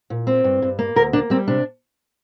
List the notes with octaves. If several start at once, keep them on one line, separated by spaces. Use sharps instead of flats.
A#2
C4
G2
G2
A#3
D2 A#4
A#3 D4
G3 C4
C3 D4